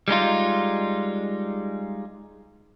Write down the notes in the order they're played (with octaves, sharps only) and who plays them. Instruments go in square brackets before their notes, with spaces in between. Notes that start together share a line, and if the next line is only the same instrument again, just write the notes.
[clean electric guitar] G3 G#3 D#4 F4